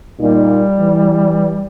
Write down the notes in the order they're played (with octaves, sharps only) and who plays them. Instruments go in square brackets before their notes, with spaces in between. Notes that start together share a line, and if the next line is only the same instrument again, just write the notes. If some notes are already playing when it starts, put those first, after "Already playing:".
[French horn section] A#2 D#4 [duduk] G3
[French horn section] E3